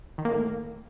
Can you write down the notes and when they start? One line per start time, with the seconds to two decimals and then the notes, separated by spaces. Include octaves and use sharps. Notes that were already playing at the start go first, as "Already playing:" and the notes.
0.18 D#3
0.25 A#3
0.32 A2